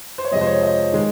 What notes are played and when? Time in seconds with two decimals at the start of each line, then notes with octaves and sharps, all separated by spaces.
0.18 C5
0.25 C#5
0.32 F2 C3 F3 G#3 D#5
0.41 C5
0.47 C#5
0.63 D#5
0.92 D#3 G#3